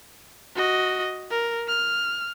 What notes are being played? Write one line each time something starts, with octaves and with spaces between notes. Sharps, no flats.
F#4 D#5
A#4
F6